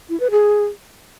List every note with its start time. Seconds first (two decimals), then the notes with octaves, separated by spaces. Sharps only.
0.09 E4
0.20 B4
0.31 G#4